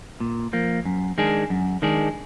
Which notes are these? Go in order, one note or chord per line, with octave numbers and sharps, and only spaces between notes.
A#2
F3 A#3
F#2
D#3 G#3 D4 G#4
F#2
D#3 G#3 D4 G#4